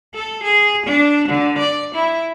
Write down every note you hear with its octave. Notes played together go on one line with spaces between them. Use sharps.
A4
G#4
D4
D3
D5
E4